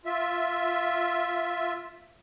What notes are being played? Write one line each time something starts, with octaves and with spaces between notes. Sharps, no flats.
F4 E5